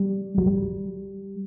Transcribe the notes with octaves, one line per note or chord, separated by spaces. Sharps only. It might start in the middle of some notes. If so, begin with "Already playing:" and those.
Already playing: G3
F#3
G3